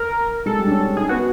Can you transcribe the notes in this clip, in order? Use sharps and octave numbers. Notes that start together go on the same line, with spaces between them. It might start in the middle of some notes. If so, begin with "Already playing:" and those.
Already playing: A#4
G#3 A4
G3
D4
C#4
D4
D#4 G#4
B3 F#4